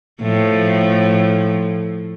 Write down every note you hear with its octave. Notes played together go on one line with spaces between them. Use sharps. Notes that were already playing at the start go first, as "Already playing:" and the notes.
A2 F3